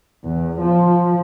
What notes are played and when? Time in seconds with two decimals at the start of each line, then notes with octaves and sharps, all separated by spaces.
0.24 E2
0.60 F3